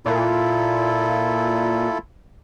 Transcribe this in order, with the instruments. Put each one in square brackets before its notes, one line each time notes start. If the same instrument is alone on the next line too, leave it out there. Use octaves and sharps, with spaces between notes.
[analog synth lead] A#2 [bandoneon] E4 F4 A4